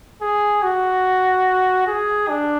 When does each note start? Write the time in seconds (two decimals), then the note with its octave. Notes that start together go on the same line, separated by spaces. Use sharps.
0.22 G#4
0.63 F#4
1.87 G#4
2.28 D4